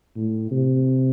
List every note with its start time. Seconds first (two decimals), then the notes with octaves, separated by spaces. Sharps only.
0.16 A2
0.51 C3